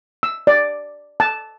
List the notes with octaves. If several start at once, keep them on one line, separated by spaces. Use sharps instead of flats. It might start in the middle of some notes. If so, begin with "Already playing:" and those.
E6
D5
A5